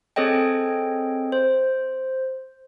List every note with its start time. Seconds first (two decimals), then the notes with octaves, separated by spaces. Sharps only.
0.16 C4 G#4 A4 C#5 D#5 G5
1.32 C5